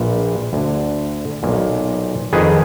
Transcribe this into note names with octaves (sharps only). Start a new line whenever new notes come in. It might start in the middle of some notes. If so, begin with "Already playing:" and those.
Already playing: A#1 A#2 B4
D2 D3
B1 A#2
F2 D#3 G#4 B4